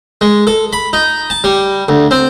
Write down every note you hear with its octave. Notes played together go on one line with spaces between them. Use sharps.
G#3
A4
B5
D#4
A5
G3
D2
C4